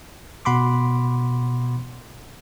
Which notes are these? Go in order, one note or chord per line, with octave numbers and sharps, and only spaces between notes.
B2 F#5 B5 C6 D6